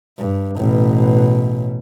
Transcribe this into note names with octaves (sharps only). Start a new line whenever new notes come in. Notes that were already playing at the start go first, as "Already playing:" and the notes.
G2
A1 B2